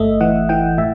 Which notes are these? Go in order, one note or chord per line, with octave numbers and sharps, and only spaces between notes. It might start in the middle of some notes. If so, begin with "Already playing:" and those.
Already playing: G1 A3 D#5 E5
E3 F#5
E3 G5
A2 E5